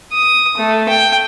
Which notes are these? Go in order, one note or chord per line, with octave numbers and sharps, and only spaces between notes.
D#6
A3
G5